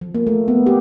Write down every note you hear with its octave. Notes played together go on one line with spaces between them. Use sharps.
F3
A#3
A3
B3
G4